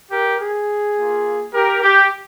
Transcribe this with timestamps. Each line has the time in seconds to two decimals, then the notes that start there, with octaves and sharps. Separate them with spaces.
0.11 G4 A#4
0.40 G#4
0.97 A#3 F4
1.54 G4 A#4
1.82 G4